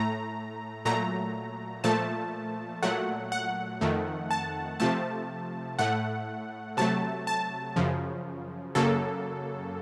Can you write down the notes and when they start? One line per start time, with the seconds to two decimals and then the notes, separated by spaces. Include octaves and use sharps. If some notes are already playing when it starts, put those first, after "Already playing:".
Already playing: A2 A3 A#5
0.85 A#2 F#3 A3 A#5
1.84 A#2 F3 A3 A5
2.83 A#2 F#3 A3 F#5
3.32 F#5
3.81 F2 D#3 A3
4.31 A5
4.80 C3 F3 A3 A5
5.79 A2 A3 F#5
6.77 C3 F#3 A3 A5
7.27 A5
7.76 F#2 C#3 F3
8.75 F#2 C#3 F#3 A#3 A4